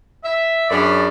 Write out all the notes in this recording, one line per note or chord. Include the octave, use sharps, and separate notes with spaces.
E5
F#2 C#4 D4 G#4 D5 B5